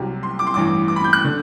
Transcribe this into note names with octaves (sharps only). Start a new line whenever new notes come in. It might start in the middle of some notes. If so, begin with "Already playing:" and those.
Already playing: C2 C3 F#3
C6
D6
C6
A1 G2 E3 D6
D6
B5
G6
F#6
D3